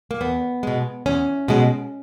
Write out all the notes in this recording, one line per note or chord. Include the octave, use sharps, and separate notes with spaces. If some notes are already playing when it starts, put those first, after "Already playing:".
A#3
E2 B3
B2 G#3
E2 C#4
B2 G#3